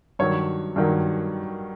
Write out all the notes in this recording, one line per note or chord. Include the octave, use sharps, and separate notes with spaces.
G2 D#3 F#3 C#5
G2 D#3 F#3